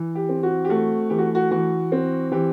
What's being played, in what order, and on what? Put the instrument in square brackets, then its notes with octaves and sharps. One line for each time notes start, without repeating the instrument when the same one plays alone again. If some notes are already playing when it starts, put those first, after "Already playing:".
Already playing: [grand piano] E3
G4
C4
F#4
G4
A3 F#4
E3 G4
F#4
F#4
E3 F#4
C4
E3 G4